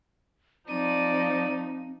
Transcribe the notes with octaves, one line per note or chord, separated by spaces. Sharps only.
F3 C4 D#4 D5 D#7